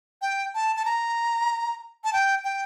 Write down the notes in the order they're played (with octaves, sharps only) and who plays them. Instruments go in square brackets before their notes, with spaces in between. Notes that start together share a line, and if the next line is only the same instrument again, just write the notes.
[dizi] G5
A5
A5
A#5
A5
G5
G5